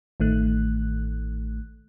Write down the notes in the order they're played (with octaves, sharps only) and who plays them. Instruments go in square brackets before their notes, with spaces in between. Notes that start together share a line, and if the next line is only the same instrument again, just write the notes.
[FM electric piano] A1 D#3 A3 F#6